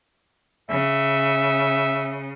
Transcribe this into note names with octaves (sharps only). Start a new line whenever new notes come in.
C#3 E5